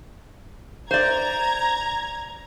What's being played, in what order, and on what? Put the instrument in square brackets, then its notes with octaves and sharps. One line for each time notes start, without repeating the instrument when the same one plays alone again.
[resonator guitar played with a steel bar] C5 D5 [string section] A#5 G#6